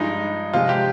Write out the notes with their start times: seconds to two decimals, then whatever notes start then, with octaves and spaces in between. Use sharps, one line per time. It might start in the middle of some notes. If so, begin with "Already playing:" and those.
Already playing: G2 F3 G#3 D#4
0.53 C3 F3 G#3 F4
0.69 G4